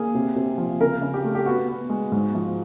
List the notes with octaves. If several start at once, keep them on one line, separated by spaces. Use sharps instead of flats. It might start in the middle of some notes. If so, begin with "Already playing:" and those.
Already playing: A#3 G#4
C3
C3
F3
C#3 A#4
C#3
G4
A3
G4
B3 F#4
B3
G#3
G#2
F3